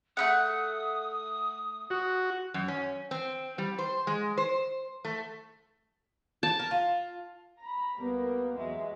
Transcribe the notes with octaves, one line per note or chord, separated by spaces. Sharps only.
A3 B3 F#5 D#6
F#4
F#2
C#4
C4
G3
C5
G#3
C5
A3
A5
A#4
F4
A#5 B5
C2 G3 A#3 B3
E2 F#3 G#3 E5